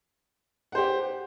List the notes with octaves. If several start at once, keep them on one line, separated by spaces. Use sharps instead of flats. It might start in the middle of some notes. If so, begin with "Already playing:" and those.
G4 C5 F#5